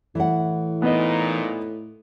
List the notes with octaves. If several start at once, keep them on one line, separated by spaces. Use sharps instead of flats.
A2 E3 F#5
A#2 B3 D#4 D#5